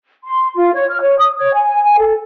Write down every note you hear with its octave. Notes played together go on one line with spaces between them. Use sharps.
C6
F4
C#5
F6
C#5
D#6
C#5
G#5
G#5
A4